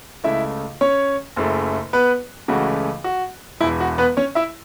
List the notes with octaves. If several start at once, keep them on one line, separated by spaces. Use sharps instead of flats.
C#2 C#3 A3 E4 E5
C#4 C#5
F#1 F#2 C#3 A3
B3 B4
C#2 C#3 E3 A3 F#4
F#4
E1 E2 E3 E4
F#4
B3 B4
C#4 C#5
E4 E5